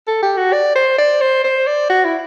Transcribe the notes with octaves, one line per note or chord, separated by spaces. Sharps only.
A4
G4
F#4
D5
C5
D5
C5
C5
D5
F#4
E4